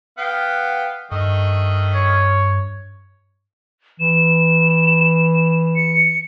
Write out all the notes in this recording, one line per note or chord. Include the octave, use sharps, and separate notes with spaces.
B3 F5 G5
G2 D#3 A3 D#5
C#5
E3 E7
C#7